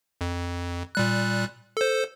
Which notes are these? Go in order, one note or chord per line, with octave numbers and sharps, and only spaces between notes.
F2
A#2 G3 F#6
A4 C5